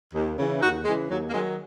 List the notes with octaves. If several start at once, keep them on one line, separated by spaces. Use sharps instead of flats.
D#2
C#3 E3
D#2 D#4 F#4
C#3 E3 G#3
D#2 F#3
A#3
D#3 F#3 G#3